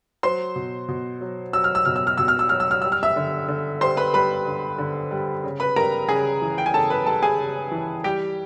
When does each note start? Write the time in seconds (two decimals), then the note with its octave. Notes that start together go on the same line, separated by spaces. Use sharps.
0.23 F#3 C5 C6
0.56 B2
0.88 B2
1.21 F#3
1.53 F#3 E6
1.64 F6
1.75 E6
1.85 B2 F6
1.96 E6
2.07 F6
2.18 B2 E6
2.28 F6
2.39 E6
2.49 F#3 F6
2.60 E6
2.71 F6
2.82 G3 E6
2.92 F6
3.03 E5 E6
3.16 D3
3.48 D3
3.81 G3 C5 C6
3.97 B4 B5
4.14 G3 B4 B5
4.46 D3
4.78 D3
5.11 G3
5.44 C#3
5.60 B4 B5
5.76 G3 A#4 A#5
6.09 C#3 G#4 G#5
6.42 E3
6.58 G5
6.66 G#5
6.74 C#3 A4 A5
6.90 B4 B5
7.06 G3 A4 A5
7.23 G#4 G#5
7.39 C#3
7.72 E3
8.04 G3 G4 G5